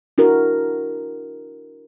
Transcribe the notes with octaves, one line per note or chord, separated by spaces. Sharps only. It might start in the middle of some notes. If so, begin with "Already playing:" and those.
D4 E4 F#4 A#4